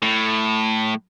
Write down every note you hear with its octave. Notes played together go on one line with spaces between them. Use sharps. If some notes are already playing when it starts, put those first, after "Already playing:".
A2